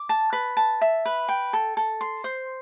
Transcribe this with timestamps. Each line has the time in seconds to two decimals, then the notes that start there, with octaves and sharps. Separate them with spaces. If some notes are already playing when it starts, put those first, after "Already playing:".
Already playing: D6
0.09 A5
0.33 B4
0.57 A5
0.81 E5
1.06 B4
1.29 G5
1.53 A4
1.77 A4
2.01 C6
2.24 C5